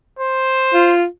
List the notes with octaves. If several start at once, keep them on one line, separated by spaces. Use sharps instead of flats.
C5
F4